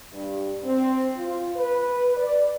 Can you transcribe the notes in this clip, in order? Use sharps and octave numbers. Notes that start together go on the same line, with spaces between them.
G2
C4
F4
B4
D5